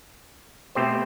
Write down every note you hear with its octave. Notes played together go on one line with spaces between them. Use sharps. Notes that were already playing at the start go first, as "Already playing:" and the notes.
B2 A3 C4 G4 C5